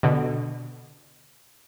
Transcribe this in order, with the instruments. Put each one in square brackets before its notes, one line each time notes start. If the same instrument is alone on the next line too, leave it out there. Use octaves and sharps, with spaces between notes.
[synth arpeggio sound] B2 D3